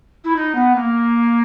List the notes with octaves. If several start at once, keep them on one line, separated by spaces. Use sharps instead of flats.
E4
D#4
B3
A#3